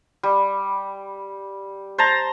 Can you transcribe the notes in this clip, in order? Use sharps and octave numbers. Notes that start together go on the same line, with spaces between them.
G3
C5 A5 A#5